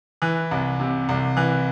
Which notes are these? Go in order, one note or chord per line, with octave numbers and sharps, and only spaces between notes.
E3
C2
C3
C2
E3